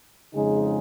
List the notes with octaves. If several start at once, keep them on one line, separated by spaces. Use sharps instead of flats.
F2 C#3 G#3 D#4 G#4